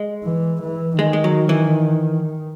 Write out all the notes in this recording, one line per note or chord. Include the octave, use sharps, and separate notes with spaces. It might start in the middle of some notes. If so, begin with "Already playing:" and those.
Already playing: G#3
E3
E3
D#3 G#3
G#3
F#3
E3